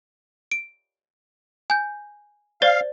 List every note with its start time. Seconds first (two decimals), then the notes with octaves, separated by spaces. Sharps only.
0.52 D7
1.70 G#5 G6
2.62 C5 D5 F5 A6